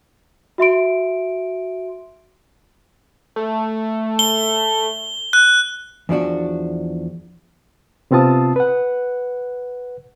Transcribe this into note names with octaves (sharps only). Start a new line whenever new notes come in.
F#4 E5 C6 D7
A3
G7
F#6
E2 F3 D4 F#4
C3 B3 C4 F4 A5 D#6
B4 F#5